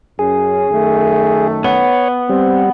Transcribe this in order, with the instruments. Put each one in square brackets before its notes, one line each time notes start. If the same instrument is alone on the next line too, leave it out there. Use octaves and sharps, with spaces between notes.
[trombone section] F#2 C#4 [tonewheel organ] G#4
[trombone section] F#2 D#3 A3
[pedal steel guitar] B3 [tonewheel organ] C#5
[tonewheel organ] G3 [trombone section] C4